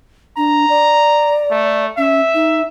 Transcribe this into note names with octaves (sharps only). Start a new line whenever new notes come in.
D4 A#5
D5
A3
C#4 E5
D#4